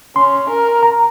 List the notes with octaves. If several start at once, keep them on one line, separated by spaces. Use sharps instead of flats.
C#4 C6
A#4
A#5